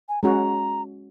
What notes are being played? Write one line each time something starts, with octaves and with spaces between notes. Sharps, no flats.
G#5
G#3 C#4 F#4 A#5